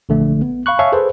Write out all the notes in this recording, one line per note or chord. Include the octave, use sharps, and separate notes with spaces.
A#1 D3 A3
B3
F5 B5 C#6 F#6
C#5 E5 F5 G#5 A5 C#6
G#4 A4 B4 C5